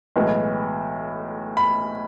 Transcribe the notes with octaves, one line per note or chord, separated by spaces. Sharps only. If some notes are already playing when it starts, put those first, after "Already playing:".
B1 A2 E3 G#3 B3
B5